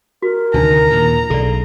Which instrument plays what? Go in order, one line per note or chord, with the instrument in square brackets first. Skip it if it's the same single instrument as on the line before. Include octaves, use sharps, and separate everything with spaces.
[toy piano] F#4 [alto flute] A#4
[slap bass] D2 C3 D#3 [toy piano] D4 D#4 C5 [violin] A#5
[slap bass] D#2 A#2
[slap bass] B1 C#3 [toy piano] A4 D5